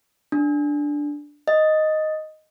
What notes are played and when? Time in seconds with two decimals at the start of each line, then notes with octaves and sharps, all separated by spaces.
0.32 D4
1.48 D#5